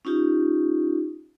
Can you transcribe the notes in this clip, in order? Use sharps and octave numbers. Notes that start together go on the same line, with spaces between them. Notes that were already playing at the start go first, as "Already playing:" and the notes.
C#4 D#4 F4 G4